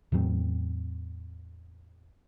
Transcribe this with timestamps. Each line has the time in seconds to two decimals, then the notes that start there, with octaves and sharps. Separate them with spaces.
0.12 E2 A2 F#3 C4